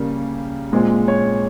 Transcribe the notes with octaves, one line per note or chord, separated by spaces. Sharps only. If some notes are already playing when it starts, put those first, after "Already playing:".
Already playing: C#3 G3 A#3
A#2 G#3 C4
C#5